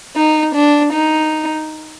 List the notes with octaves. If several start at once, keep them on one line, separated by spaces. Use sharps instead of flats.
D#4
D4
D#4